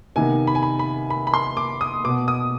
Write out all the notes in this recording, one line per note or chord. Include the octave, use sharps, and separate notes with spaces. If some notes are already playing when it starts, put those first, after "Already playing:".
C3 D#3 B3 G#5
B5
G#5
B5
B5
B5
B5
C6
D6
D#6
B2 B3 D6
D#6